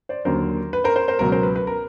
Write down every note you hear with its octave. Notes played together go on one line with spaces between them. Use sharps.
C5 D5
D#2 D3 F#3 A#4 C5
B4
A#4 C5
A#4 C5
A#4 C5
C#2 B2 F#3 A#4
A#4 C5
B4
B4
A#4